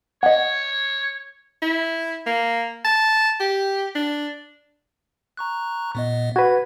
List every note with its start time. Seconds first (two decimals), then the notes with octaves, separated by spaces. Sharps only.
0.23 C#5 D#5 F#5
1.62 E4
2.26 A#3
2.84 A5
3.40 G4
3.95 D4
5.37 A#5 C#6 F#6
5.95 A#2 B3 D#5
6.36 F#4 B4 G#6